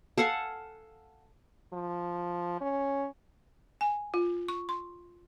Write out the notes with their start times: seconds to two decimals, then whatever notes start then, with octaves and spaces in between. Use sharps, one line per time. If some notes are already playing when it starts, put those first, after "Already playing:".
0.18 A4 F5 F#5 G#5
1.73 F3
2.61 C#4
3.81 G#5
4.14 F4
4.49 C#6
4.69 C6